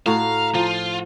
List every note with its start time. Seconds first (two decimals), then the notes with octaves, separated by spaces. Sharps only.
0.06 A2 F#4 F5 A#5
0.55 F3 F4